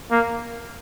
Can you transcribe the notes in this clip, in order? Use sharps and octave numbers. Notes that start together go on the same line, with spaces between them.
A#3